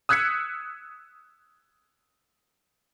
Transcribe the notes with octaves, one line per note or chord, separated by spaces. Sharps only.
D#6 E6 F#6 G#6 B6 C#7